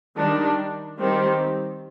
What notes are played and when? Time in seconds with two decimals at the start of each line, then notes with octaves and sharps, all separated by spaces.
0.17 D#3 G3 D4
0.98 D#3 G3 C4 G4